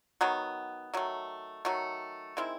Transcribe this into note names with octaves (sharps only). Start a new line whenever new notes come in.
D#3 F#3 B3
D#3 F#3 A3
D#3 F#3 A3
D#3 G#3 C4 E4